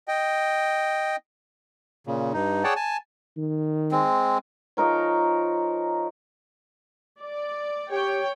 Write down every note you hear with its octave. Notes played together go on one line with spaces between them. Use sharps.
D#5 G5
A#2 C#3
G2 D#4
G#4 C#5 D5 F#5 G5 A5
G#5 A5
D#3
G#3 C4
F3 D#4 A#4 C#5
D5
G4 C#5 G5